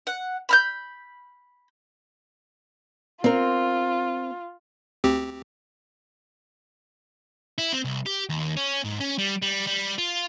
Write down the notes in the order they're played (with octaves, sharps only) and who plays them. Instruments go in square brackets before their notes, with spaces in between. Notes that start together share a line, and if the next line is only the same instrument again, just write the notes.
[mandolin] F#5
B5 F6 G6
[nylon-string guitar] C4 A#4 [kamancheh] F4
[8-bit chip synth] D2 C4 G4
[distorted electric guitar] E4
C4
C2
G4
D#2
C#4
G#2
C#4
G3
G3
G3
F4